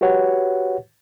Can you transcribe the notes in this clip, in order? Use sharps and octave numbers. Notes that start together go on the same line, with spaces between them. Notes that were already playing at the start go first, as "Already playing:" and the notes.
F#4 G4 B4 C#5 F#5